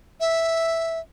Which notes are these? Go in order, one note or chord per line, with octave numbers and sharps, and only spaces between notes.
E5